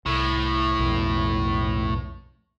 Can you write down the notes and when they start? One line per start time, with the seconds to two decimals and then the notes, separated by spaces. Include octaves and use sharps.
0.06 C2 A2
0.79 B1 F2